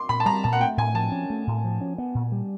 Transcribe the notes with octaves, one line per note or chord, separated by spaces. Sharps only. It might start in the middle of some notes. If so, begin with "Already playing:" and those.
Already playing: C6 D6
A#2 B5
A5
G3 A#5
A#2 A5
F#5
A3 G5
A2 G#5
F3 A5
C#4
A3
A2
F3
C#4
B3
A#2
G3